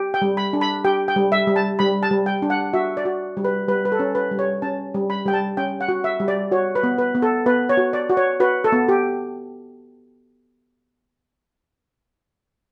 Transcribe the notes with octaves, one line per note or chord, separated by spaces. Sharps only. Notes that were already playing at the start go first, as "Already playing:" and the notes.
Already playing: G4
G5
G3
B5
D4
B5
G4 G5
G5
G3
E5
G3
A5
G3 B5
A5
G3
G5
D4
F#5
F#4 E5
D5
F#4
G3
B4
G3 B4
B4
A4
C#4
B4
G3
C#5
C#4 A5
G3
B5
G3 G5
A5
C#4 G5
F#5
F#4
E5
G3
D5
F#4 C#5
B4
B3
B4
B3
A4
B3 B4
C#5
F#4
D5
F#4
C#5
F#4 B4
A4
B3
G4